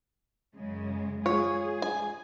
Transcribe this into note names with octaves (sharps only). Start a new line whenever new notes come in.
F#2 C#3 G#3
G#3 F4 G#4 C#5
G#5